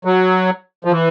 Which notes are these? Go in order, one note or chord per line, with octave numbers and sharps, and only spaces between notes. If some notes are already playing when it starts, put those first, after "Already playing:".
F#3
F3
E3